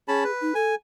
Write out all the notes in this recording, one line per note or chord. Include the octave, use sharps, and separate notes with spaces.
C#4 G#4 A5 B5
B4
D#4
A4 G#5